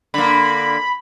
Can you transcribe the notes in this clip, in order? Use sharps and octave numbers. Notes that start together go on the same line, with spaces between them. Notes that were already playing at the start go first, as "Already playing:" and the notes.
D3 A#3 B5